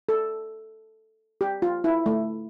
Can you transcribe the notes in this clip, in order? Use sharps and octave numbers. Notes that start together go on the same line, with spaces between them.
A4
G4
F4
E4
A3